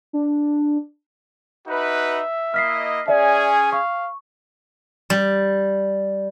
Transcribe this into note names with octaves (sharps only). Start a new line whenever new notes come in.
D4
D#4 F#4 B4 E5
A#3 E4 D#5 F6 B6 C7
C#4 G#4 D5 E5 G#5
F5 C#6
G3